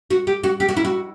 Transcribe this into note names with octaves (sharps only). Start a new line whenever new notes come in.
F#4
G4
F#4
G4
F#4
E4
F#4